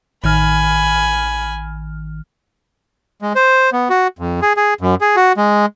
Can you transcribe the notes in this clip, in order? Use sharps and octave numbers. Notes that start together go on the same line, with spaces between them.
A1 D#3 G#5 B5 F6
G#3
C5
B3
F#4
F2
G#4
G#4
F#2
G#4
F#4
G#3